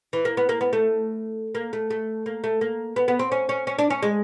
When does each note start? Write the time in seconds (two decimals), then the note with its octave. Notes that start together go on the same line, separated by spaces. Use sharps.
0.13 E3
0.25 A#3
0.37 B3
0.49 A#3
0.61 B3
0.73 A3
1.55 A#3
1.73 A3
1.90 A3
2.26 A#3
2.44 A3
2.61 A#3
2.96 B3
3.08 B3
3.19 C4
3.31 C#4
3.49 C#4
3.67 C#4
3.78 D4
3.90 C#4
4.02 G#3